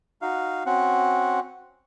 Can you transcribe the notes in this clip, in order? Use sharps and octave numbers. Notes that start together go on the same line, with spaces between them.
D#4 F#4 F5
C4 C#4 F#4 F#5